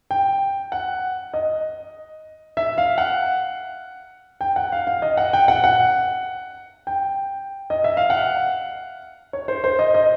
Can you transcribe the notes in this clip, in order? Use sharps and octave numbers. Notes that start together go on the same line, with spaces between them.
G5
F#5
D#5
E5
F5
F#5
G5
F#5
F5
F5
D#5
F#5
G5
F#5
F#5
G5
D#5
E5
F5
F#5
C#5
C5
C5
D#5
D#5